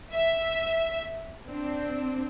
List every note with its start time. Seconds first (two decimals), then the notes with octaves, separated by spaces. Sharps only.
0.12 E5
1.49 C4 D4